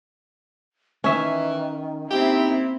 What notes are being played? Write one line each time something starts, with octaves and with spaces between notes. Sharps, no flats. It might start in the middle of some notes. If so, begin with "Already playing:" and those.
D#3 E3 C#4 E5
A#3 C4 D#4 E4 G4